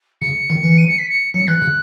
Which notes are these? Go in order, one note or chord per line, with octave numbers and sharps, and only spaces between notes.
C#3 C#7
D#3
E3
D#7
C#7
B6
C#7
F#3 C#7
E3 F#6
C#3